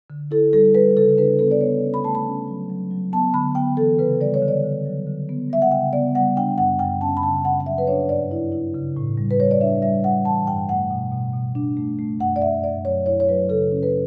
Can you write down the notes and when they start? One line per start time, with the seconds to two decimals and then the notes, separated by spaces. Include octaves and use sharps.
0.10 D3
0.31 E4 A4
0.53 G3 A4
0.75 G3 B4
0.97 C#3 A4
1.18 D4 B4
1.39 B3 A4
1.51 D5
1.61 B3 C#5
1.82 C#4
1.94 B5
2.04 A3 A5
2.15 B5
2.26 C#4
2.48 F#3
2.70 F#3
2.91 F#3
3.13 B3 A5
3.34 D3 B5
3.55 B3 G5
3.77 E3 A4
3.99 C#3 B4
4.21 G3 D5
4.34 C#5
4.42 D3
4.48 D5
4.64 D3
4.86 F#3
5.07 D3
5.29 B3
5.50 G3 E5
5.62 F#5
5.71 C#3 G5
5.93 B3 D5
6.15 G3 F#5
6.36 D4 G5
6.58 F#2 F#5
6.79 F#2 G5
7.01 C#4 A5
7.17 B5
7.23 C#3 A5
7.45 C#4 F#5
7.60 F#5
7.66 F#3 E5
7.78 B4
7.87 D4 C#5
8.09 G2 D5
8.31 E4
8.52 E4
8.75 C#3
8.97 A2
9.18 G3
9.31 B4
9.39 G3 C#5
9.51 D5
9.61 D4 E5
9.82 G3 E5
10.04 G3 F#5
10.25 E3 A5
10.47 G2 G5
10.69 A3 F#5
10.91 B2
11.12 B2
11.34 B2
11.55 D4
11.77 A3
11.99 A3
12.20 F#2 F#5
12.36 D5
12.42 F#2 E5
12.64 F#2 D5
12.85 F#3 C#5
13.06 E4 C#5
13.20 C#5
13.29 F#3 B4
13.49 C#3 A4
13.71 C#4
13.83 B4